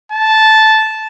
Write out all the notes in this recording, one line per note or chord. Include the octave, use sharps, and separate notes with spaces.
A5